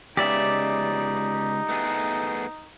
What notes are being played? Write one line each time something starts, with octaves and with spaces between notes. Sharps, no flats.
C#3 G#3 B3 D#4 G4 D5 E5
A3 B3 G#4